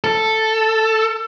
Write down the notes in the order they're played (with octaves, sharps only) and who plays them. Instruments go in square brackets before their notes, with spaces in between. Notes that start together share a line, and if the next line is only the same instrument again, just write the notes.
[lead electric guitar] A4